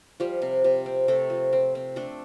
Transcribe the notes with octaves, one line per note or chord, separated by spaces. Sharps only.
F3 G3 G4
C3
C3
C4
C3 A3 A4
F3
C4
C4
A3 D4 A4